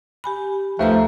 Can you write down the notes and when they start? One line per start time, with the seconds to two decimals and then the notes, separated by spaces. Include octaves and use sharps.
0.24 G4 G#5 B5
0.79 D#2 F3 A3 B4 A#5